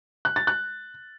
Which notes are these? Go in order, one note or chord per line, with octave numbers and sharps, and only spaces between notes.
F#6
A6
F#6